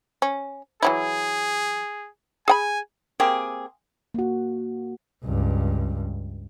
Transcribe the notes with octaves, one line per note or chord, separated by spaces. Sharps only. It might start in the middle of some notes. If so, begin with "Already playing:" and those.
C#4
E3 F#3 E4 G#4
G#4 F#5 G#5 B5
A#3 C4 G4 G#4
A#3 F#4
C#2 G2